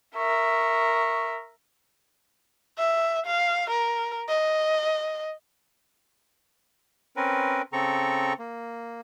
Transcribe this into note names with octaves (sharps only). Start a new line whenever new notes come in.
A#4 E5 C#6
E5
F5
A#4
D#5
C4 C#4 A#4 B4
C#3 C4 A4 A#5 C#6
A#3